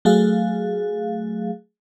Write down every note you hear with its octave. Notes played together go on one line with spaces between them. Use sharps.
F#3 A3 G#4 F5